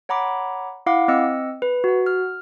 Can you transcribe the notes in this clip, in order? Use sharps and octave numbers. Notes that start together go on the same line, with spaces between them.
C#5 F#5 A#5 B5 D6
E4 F5 F#5 D6
C4 D#5 E6 C#7
B4
F#4 F#5
F6